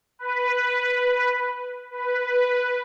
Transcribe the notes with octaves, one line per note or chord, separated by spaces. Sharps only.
B4
B4